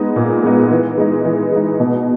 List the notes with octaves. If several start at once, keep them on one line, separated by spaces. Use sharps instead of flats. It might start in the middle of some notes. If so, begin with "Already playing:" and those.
Already playing: G#3 B3 D#4
A#2
G#3 B3 D#4
E3
G#3 D#4
E3
G#3 D#4
B2